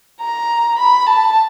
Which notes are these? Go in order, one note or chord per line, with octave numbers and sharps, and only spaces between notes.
A#5
B5
A5